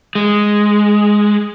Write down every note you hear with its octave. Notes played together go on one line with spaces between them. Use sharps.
G#3